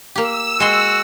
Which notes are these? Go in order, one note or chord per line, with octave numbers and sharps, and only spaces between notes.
A#3 G4 E6
G#3 F#4 G5 C6